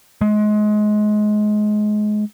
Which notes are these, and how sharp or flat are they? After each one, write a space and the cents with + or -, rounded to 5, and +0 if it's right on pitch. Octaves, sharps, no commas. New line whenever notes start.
G#3 +25